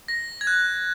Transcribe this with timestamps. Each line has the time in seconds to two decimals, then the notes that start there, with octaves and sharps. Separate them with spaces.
0.08 A#6
0.41 G#6
0.47 F#6